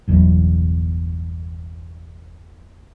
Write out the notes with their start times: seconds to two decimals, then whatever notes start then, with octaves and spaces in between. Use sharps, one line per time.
0.07 G1 E2 B2 F#3